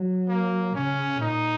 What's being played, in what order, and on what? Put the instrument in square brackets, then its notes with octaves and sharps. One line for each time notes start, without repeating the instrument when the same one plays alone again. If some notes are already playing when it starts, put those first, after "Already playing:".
Already playing: [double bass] F#3
[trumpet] A#3
[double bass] C#3 [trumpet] C#4
[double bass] A#2 [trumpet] D#4